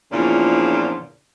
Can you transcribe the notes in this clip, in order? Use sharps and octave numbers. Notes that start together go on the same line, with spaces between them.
E2 A#2 C#3 F3 D4